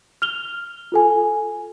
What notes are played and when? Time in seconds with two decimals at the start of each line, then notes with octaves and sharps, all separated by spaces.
0.22 F6 F7 G7
0.92 F4 A4 G#5